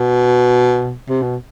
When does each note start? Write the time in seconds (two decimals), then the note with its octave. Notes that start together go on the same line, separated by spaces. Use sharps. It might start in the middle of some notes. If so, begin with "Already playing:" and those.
Already playing: B2
1.09 C3
1.23 B2